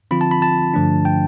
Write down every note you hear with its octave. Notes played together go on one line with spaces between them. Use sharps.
D3 F3 C4 F4 B5
A5
B5
A5
G2 D3 F3 A3 D4
G5